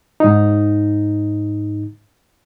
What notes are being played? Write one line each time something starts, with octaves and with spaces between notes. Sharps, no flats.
G#2 D#4